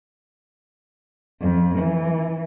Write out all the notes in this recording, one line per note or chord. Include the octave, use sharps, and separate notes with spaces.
F2
E3